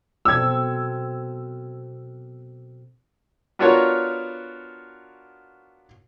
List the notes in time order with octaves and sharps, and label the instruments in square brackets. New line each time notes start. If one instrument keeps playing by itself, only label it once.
[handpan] B2 C4 A4 [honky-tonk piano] E6 G#6
[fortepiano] B3 D4 F4 F#4 A#4 C#5